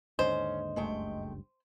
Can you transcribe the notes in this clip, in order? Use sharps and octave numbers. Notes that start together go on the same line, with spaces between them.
D#2 G#2 D3 C#4 C5 D#5
F#1 C#2 G2 G#3 A3 G5